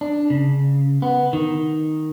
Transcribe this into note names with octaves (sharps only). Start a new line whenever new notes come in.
D4
C#3
B3
D#3